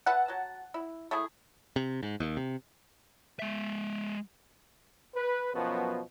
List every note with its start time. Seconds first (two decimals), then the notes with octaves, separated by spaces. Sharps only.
0.06 B4 E5 F#5 A5
0.28 F#3 A5
0.74 E4
1.11 A3 E4 G#4
1.76 C3
2.03 G#2
2.20 D#2
2.37 C3
3.39 G#3 E5
5.15 B4
5.54 F#2 B2 F3 F#3 B3 F#4